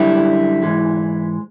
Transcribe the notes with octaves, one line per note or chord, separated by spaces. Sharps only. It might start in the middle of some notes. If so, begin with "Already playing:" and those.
Already playing: F#2 D3 G3 E4
G#2 E3 G#3